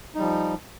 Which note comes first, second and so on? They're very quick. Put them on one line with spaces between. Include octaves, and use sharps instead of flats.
D#4 G3 F3